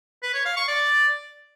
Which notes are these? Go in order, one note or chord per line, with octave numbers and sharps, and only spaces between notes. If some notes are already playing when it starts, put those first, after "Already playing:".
B4
C#5
F5
C#6
D5